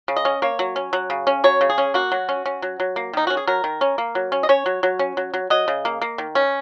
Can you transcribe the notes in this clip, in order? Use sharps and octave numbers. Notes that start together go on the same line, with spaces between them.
C#3
D#5
C#4
A#3 C#5
F#3
C#4
F#3
C#3
C#4
F#3 C#5
C#3
G#4
C#4
A#3 F#4
F#3
C#4
C#4
F#3
F#3
A#3
D#3 D#4
C#4 F#4
G#4
F#3 A#4
D#3
C#4
A#3
F#3
C#4
D#5
C#4 C#5
F#3
F#3
C#4
F#3
F#3
F#3 D#5
C#3
A#3
A#3
D#3
C#4